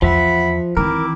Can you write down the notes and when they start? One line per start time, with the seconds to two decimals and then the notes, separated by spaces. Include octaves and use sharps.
0.02 E2 F3 E5 F#5 B5
0.77 D#3 E3 C4 E4 A#4 D6